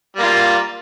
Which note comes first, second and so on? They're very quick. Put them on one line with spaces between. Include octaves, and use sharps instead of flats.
G3 A#3 F4